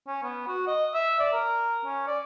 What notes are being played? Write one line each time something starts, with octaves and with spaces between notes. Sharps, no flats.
C#4
B3
F#4
D#5
E5
D5
A#4
C#4
D5